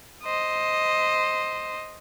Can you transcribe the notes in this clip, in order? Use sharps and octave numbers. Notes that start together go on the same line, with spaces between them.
C5 D#5